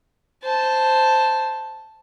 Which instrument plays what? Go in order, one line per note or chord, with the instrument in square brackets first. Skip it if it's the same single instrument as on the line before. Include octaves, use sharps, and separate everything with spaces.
[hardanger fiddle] C5 A5